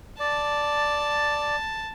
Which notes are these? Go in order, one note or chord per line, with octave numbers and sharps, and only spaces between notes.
D5 A5